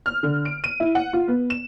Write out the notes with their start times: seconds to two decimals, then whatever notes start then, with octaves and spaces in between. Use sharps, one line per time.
0.06 F6
0.23 D3
0.45 D7
0.64 D#7
0.80 E4
0.95 F#5
1.13 F4
1.28 B3
1.50 E7